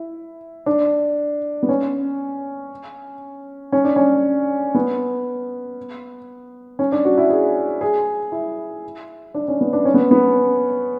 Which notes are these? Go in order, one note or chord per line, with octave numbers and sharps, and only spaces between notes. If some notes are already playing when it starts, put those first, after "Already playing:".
Already playing: E4
D4
B3
C#4
C#4
D4
C#4
B3
C#4
D4
F#4
E4
G#4
G#4
E4
D4
C#4
B3
D4
C#4
B3
B3